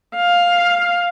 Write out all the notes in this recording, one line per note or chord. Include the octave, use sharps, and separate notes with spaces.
F5